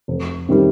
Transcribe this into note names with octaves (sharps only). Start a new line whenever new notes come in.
F1
C3 D#3 G3